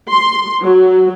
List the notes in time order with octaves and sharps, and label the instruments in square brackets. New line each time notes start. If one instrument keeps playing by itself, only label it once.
[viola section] C6
F#3